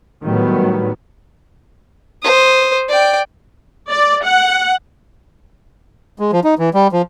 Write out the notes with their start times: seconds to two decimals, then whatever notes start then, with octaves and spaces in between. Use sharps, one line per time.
0.22 A2 D#3 F#3 G3 B3
2.22 C5 D#6
2.88 D5 G5
3.91 D5
4.24 F#5
6.19 G#3
6.33 F3
6.44 D#4
6.59 E3
6.74 G3
6.92 F3